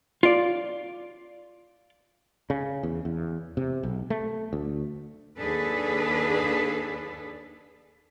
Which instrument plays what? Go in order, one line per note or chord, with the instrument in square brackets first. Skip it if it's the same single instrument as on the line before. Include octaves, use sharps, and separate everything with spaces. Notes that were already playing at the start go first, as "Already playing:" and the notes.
[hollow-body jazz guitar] F4 D5
[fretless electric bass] C#3
E2
E2
C3
B1
A3
D2
[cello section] D#2 D4 G#4 A4 B4